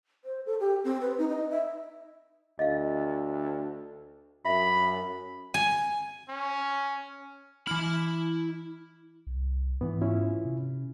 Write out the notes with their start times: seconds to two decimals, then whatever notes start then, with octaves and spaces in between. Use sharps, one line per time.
0.25 C5
0.46 A4
0.60 G4
0.84 C4
1.01 B4
1.18 D#4
1.29 D#5
1.51 E5
2.59 D2 D#5 F5
4.45 F#2 E5 B5
5.54 G#5
6.29 C#4
7.67 E3 E4 B5 F6
9.27 C2
9.81 G#2 E3 B3
10.01 C#4 E4 F4
10.45 C3